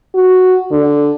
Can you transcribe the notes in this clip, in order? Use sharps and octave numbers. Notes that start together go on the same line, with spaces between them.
F#4
D3